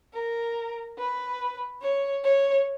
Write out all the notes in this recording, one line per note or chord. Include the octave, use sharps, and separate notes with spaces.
A#4
B4
C#5
C#5